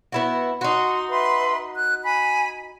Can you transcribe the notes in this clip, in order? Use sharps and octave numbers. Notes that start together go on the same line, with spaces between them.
B3 E4 F#4
D#4 F#4 C6
B4 E5 C6
F#6
G#5 B5